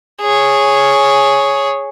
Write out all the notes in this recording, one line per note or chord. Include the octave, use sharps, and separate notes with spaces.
G#4 C#5